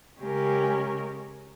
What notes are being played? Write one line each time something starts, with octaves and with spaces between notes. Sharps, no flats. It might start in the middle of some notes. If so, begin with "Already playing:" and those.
C#3 G#3 C#4 G4 A#4